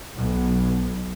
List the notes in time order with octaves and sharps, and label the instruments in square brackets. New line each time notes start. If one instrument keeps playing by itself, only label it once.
[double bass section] B1